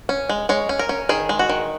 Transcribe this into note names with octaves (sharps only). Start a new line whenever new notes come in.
C#4
G#3
G#3 C#5
C#4
A#4
C#4
D#3 G#4
G#3
F#4
D#3